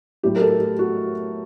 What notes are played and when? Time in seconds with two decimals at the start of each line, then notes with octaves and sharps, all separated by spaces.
0.23 A2 F#3 G4
0.36 A#4
0.41 A4
0.60 G4
0.79 F#4